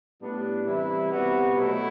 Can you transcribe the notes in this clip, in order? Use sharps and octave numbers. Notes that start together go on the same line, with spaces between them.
A2 G3 B3 D4
C3 E3 G3 E4
C3 G3 B3 F#4
B2 F#3 A3 E4